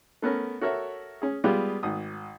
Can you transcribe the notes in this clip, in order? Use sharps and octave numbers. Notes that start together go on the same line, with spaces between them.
A3 B3 C#4 A#4
F#4 A4 A#4 C#5 E5
C#4 G#4
G3 G#3 B3 F4 G4 G#4
G#1 D#6